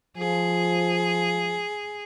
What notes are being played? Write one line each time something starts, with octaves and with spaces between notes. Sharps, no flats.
F3 G#4